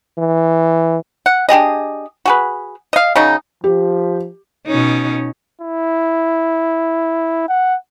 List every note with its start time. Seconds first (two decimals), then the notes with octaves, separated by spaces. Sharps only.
0.18 E3
1.26 F#5
1.49 D4 G4 G#4 D#5
2.25 F#4 G#4 B4
2.93 D#5 F5
3.16 C#3 F#3 D#4
3.64 F3 G4
4.67 B2 C#4 D#4
5.61 E4
7.49 F#5